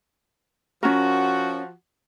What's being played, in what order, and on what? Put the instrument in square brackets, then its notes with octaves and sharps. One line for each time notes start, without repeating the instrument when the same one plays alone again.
[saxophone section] F3 F#4 [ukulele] C#4 A#4